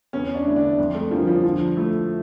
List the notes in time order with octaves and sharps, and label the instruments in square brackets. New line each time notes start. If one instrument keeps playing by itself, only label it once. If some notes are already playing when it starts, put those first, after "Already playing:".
[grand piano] E2 [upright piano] C#4
[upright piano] D4
[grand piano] D3 A3 E4
[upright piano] D4
[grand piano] F2
[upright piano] A3
[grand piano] D3 G3 A#3 C#4 [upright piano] F3
[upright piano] F3
[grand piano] D3 [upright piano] F3
[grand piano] A3 E4